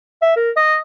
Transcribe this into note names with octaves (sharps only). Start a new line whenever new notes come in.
E5
A#4
D#5